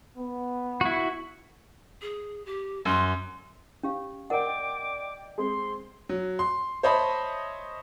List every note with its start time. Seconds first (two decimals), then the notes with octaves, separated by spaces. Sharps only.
0.18 B3
0.81 E4 F#4
2.02 G#4
2.46 G4
2.85 F#2 C6
3.83 C#4 G4 F5
4.30 A#4 D5 D#5 F#5 G5 D6
5.38 G#3 C4 G#4 C6
6.09 F#3
6.39 C6
6.83 C5 C#5 D#5 E5 A5 B5